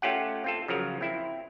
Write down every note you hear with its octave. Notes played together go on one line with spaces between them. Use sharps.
A3 C#4 F4 G4 F#5
C4 F4 A4
C#3 F3 F#3 A#4
C4 E4